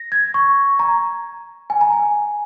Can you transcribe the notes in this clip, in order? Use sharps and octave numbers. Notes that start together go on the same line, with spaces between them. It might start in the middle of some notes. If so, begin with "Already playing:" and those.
Already playing: A#6
G#6
C#6
A#5
G#5
A#5
G#5